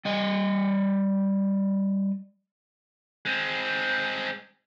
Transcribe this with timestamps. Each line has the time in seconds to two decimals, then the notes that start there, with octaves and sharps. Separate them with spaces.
0.05 G3 D#5
3.25 G#3 C4